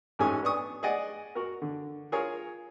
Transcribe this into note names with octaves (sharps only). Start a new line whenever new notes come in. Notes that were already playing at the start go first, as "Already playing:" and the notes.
A1 G#2 A3 C#4 G#5 D#6
B3 D4 C#6 D#6
G#4 D5 D#5 F#5
F#4 A#4
D3
F4 G#4 A#4 C#5